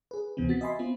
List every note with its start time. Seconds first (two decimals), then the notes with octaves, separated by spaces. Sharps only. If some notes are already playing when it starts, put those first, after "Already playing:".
0.11 G#4 B4
0.37 D2 C3 E3 B3 C4
0.49 F#4 A6 B6
0.61 D#5 E5 G#5 B5 C6
0.79 B3 C4 F4